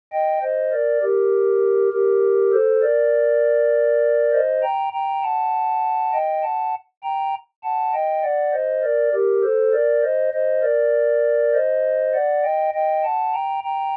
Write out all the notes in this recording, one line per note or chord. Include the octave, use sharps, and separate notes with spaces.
D#5 G5
C5 D#5
A#4 D5
G4 A#4
G4 A#4
A4 C5
A#4 D5
C5 D#5
G5 A#5
G5 A#5
F#5 A5
D#5 G5
F#5 A5
G5 A#5
F#5 A5
D#5 G5
D5 F#5
C5 D#5
A#4 D5
G4 A#4
A4 C5
A#4 D5
C5 D#5
C5 D#5
A#4 D5
C5 D#5
D5 F#5
D#5 G5
D#5 G5
F#5 A5
G5 A#5
G5 A#5